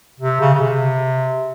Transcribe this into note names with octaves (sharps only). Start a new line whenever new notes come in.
C3
C#3
C#3
C3